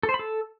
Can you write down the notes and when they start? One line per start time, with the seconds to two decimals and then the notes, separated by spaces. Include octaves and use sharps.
0.03 A4
0.09 C5
0.14 B5
0.19 A4